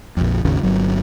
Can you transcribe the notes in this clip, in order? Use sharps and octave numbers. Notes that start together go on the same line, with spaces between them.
A#1 F2
G#1 D#2 C#3
G1 F#3